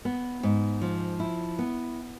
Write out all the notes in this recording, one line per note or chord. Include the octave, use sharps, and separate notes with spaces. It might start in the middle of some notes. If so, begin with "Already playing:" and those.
B3
G#2
F3
E4
B3